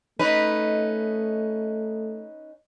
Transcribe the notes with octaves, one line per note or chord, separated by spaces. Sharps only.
A3 C#4 D#4 B4